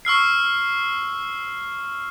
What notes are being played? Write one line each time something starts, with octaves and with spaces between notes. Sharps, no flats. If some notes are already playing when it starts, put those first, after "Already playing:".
C#6 E6 F6 C7